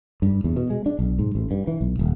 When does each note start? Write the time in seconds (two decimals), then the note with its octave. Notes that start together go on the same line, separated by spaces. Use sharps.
0.22 G2
0.44 E2
0.56 B2
0.70 G#3
0.86 D4
0.99 B1
1.19 G#2
1.35 A1
1.51 G2
1.67 E3
1.81 B1
1.99 D#1